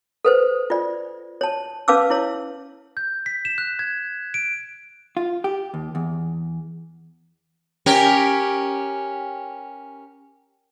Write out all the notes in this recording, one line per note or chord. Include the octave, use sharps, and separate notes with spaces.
A4 B4 C5
F4 D5
C#5 A5
C#4 B4 F5 A5 D6 E6
E4 C#5
G6
B6
E7
F#6
G#6
D7
F4
G4
D#2
E2
C#4 G4 A#4